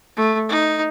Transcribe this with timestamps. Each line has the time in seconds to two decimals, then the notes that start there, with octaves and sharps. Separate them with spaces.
0.17 A3
0.49 D#4